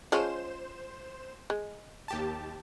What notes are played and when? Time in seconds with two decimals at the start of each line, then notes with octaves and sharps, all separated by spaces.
0.12 F3 G#3 C#4 C5 E7
1.50 G#3
2.08 D#2 G4 A5